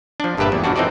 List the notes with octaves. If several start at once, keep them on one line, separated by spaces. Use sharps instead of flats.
F3 D4
G1 G2 A#2 G4 B4 E5
E2
G2 B2 G3 D4 F#4
E3 C4 D#4 A4 D5